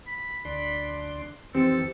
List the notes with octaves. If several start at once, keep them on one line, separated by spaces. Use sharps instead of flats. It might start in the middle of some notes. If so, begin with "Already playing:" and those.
B5
D2 D4 C6
F2 D#3 E3 C4 G4 A4